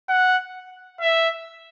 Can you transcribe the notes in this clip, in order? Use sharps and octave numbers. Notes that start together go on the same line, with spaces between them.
F#5
E5